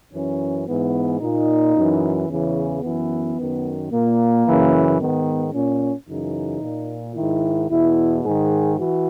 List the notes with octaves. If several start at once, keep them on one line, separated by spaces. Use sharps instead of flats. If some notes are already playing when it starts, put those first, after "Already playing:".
F#2 E3 C#4
G#2 E3 B3
A#2 D#4
F#2 E3
E2 C#3 E3 C#4
F#2 E3 B3
F#2 D#3
A#2 A#3
F#2 C#3 E3
G#2 D#3 B3
A#2 C#4
F#2 C#3 E3 D#4
A#2
G#2 D#3 E4
E2 B2 E4
G#2 D#3 G#4
E3 F#4